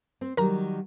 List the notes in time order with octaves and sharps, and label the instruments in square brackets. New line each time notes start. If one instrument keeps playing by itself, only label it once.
[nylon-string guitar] C4
[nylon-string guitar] D#3 F#3 G3 [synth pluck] A#4 A#5